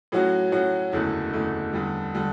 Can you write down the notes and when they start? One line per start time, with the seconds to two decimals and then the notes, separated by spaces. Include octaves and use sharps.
0.12 A2 F#3 C#4 F#4
0.52 A2 F#3 C#4 F#4
0.92 F#1 E2 D3 A3 E4
1.33 F#1 E2 D3 A3 E4
1.73 E2 D3 G3
2.14 D3 G3